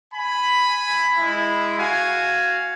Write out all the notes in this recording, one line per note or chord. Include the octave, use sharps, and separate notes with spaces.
G#5 B5
G#3 E4
F#4 F5 G#5